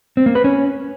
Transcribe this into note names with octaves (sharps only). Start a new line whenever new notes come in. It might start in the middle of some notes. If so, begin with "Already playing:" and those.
C4
A#3
B4
C#4